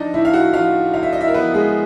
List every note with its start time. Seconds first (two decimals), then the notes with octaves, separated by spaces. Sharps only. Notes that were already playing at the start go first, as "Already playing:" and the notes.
Already playing: F3 D4 D#4 D5 D#5
0.14 A2 E4 E5
0.25 F5
0.33 F#4 F#5
0.53 F3 F4 F5
0.94 A2 F5
1.03 E5
1.13 D#5
1.20 E4 E5
1.28 A#4
1.34 F3 B3 B4
1.54 G#3 G#4